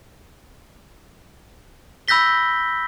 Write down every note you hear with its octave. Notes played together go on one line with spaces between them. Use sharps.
B5 E6 G6 A#6 B6 G7